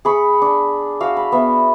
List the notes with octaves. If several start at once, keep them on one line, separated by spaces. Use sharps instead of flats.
G#4 B5 C#6
D4
F#4 F5 E6
B5
B3 E5